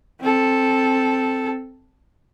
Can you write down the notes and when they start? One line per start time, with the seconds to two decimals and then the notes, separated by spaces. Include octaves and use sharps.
0.21 C4 A4